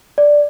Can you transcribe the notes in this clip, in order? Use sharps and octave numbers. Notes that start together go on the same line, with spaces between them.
D5